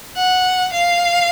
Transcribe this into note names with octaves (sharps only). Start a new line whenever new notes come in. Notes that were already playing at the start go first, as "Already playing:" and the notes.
F#5
F5